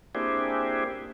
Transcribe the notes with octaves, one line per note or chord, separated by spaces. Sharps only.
A#3 C4 D4 E4 G4 G#4